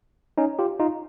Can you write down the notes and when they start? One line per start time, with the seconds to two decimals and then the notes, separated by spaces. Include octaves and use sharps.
0.38 C#4 D#4
0.59 F4 G4
0.80 D#4 F4